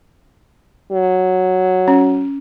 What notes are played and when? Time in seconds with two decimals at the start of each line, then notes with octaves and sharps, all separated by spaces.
0.92 F#3
1.88 C#4